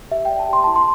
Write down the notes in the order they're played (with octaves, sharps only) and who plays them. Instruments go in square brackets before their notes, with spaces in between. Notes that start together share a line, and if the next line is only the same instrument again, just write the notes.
[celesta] G4 E5
D5 G5
A5
G4 C6
E4 A5
C6